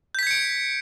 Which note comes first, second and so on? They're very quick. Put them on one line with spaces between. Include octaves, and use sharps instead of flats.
G6 B6 G#6 C#7 D7